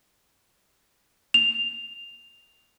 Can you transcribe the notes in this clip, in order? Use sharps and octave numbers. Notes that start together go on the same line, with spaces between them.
F7